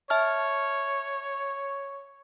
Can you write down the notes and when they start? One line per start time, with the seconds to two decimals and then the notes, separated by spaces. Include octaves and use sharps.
0.10 C#5 E5 A5 F6